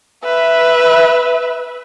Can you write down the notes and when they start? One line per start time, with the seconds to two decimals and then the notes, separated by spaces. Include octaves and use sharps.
0.24 B4 E5